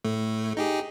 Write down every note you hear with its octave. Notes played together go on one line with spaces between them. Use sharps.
A2 A3
D#4 G4 G#4